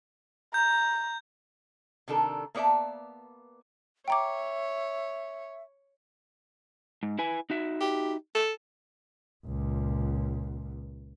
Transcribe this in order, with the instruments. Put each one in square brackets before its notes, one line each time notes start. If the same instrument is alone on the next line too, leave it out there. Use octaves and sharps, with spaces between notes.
[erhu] A#5 [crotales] G6
[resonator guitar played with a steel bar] C3 D#3 D4 A4 A#4
A#3 B3 C#5 D5 E5 A5
[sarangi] C#5 [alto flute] E5 [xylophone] G5 A#5 D6
[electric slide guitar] G#2
E4 B4 G#5
D#4 F#4 E5
[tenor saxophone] G4
A4
[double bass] C#2 A#2